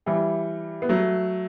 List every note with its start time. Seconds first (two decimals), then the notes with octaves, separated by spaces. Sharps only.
0.06 E3 G3
0.82 B3
0.89 F#3 A3